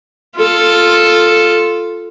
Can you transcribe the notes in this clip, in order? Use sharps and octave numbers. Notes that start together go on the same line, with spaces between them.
F4 A4